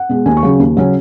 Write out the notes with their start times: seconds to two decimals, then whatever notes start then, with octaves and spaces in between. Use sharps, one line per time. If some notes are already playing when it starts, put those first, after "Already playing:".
Already playing: F#5
0.09 B2 G#3
0.26 D#2 G#5
0.37 C#6
0.43 C#3 F#3 C#4
0.59 D#2
0.77 C#3 F#3 C#4